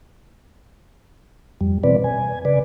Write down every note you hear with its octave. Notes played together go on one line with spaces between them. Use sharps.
F2 G3
B2 E3 C4 B4 D5
G#5
C#3 B4 D5